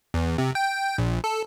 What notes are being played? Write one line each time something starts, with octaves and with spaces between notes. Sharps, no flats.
E2
C3
G5
A#1
A4